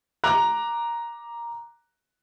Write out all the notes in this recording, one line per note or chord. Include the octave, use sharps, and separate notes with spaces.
A#5 D6 F#6